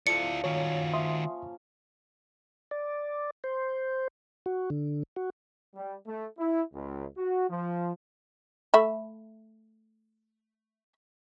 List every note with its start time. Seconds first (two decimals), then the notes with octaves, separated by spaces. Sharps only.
0.07 F3 E4 A4 D5 C#7
0.44 D#3 A#3 C#4 F#4 C#5
0.94 E5 C6 D#6
2.71 D5
3.44 C5
4.46 F#4
4.70 D3
5.16 F#4
5.75 G3
6.07 A3
6.39 E4
6.73 C#2
7.18 F#4
7.49 F3
8.74 A3 E5 B5